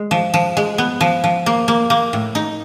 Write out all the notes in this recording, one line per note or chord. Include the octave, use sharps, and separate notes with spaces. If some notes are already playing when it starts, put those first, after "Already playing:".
Already playing: G#3
F3
F3
G#3
B3
F3
F3
A#3
A#3
A#3
A2
D#4